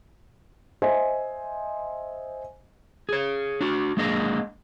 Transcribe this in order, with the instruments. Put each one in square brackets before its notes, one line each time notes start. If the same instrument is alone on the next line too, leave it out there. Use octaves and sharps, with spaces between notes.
[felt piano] C5 D#5 E5 G#5
[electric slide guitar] G#4 C#5
D4 F#4
G#3 A#3 D4 G#4 D#5